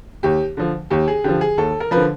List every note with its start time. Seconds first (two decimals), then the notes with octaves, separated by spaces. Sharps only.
0.23 D#2 G4
0.57 D3 F3
0.90 D#2 G4
1.08 G#4
1.24 D3 F3 G4
1.41 G#4
1.58 D#2 A4
1.80 A#4
1.91 D3 F3 B4